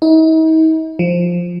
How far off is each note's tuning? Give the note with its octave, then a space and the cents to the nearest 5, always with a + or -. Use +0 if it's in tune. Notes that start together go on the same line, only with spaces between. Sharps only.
D#4 +45
F3 +5